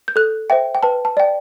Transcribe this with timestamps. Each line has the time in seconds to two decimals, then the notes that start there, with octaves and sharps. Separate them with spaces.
0.08 G6
0.16 A4 F#6
0.50 C5 E5 G5
0.75 G5
0.83 B4 A5
1.05 A5
1.17 D5 G5